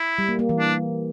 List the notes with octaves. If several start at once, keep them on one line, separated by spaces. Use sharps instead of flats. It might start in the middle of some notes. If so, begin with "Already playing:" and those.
Already playing: E4
G3
A#3
A#3
E3
D4